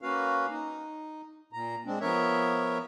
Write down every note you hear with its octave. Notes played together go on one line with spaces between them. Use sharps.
A#3 C#4 F#4 B4 F5
D#4
A#2 A#5
G#3 C4 D4
F3 B3 A#4 C#5 E5